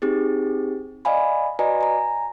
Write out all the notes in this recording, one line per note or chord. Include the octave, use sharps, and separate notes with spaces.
C4 D#4 G4 G#4
D5 D#5 F5 G#5 B5
F#4 B4 D5 D#5 G#5 A#5
G#5 A#5